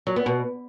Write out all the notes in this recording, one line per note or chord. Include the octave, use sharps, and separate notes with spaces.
F#3
B3
B2